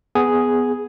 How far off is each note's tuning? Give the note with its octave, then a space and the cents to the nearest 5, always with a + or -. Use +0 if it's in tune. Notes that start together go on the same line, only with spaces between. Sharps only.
B3 +10 G#4 +0